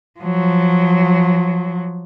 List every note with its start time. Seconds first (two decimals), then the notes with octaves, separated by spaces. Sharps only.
0.20 F3 F#3